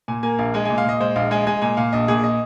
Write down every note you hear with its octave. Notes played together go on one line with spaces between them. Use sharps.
A#2 G#5
A#3 G#5
A#1 F5
G#3 G#5
A#2 G#5
F5
A#2 D#5
G#3 C5
A#1 F5
G#3 G#5
G#3 G#5
A#2 G#5
A#2 F5
A#1 D#5
A#2 G#4
D#5